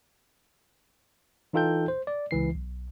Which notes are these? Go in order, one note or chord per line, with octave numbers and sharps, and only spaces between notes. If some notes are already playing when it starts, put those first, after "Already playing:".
E3 D#4 F4 A4 G5 G6
C5
D5
C#2 E3 C7
B1